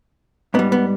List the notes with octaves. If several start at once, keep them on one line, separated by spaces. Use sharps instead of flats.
G#2 G3 B3
B3